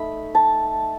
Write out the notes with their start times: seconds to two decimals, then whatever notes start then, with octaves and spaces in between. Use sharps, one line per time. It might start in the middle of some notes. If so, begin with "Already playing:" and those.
Already playing: A3 D#4 B5
0.35 A5